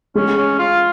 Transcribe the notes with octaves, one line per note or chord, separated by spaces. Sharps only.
G#3 C#4
C#4
F4